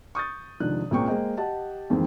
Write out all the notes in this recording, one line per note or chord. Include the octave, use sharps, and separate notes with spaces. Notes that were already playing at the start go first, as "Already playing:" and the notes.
C#6 D#6 G6 A6
F1 D#3 F3 G#3 D4 F#6
C#2 A#2 A#3 C4 G5 C#6
G#3 A#3 G#4 C5 D#5 G5
G4 D#5 F#5 A5
F2 G#2 D#3 E3 A#3 C4